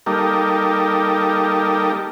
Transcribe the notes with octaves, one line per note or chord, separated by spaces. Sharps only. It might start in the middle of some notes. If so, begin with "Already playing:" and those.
G3 A#3 D#4 G4 A4 A#4